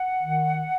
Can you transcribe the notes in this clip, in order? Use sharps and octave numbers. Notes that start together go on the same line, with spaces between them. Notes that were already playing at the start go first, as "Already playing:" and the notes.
Already playing: F#5
D#3